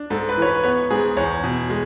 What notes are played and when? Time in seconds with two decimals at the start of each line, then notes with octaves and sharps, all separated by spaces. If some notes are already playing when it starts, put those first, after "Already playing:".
Already playing: D4
0.10 G#2 A4
0.29 B4
0.37 E3 C#5
0.46 B4
0.63 B3 C#5
0.90 G#2 G#4
1.17 E2 C#5
1.44 B2
1.70 G#3